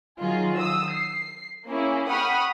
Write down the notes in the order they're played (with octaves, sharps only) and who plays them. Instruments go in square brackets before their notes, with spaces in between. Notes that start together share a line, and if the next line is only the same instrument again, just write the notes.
[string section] D#3 F#3 F4 G#4
D#6 E6
C7
A#3 C#4 E4 G#4
F#5 G5 B5 C#6 D#6 F6